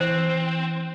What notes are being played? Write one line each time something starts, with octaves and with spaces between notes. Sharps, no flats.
E3 C4 C5